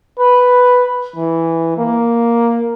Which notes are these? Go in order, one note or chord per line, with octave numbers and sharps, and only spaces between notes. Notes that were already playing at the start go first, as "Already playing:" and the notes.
B4
E3
A#3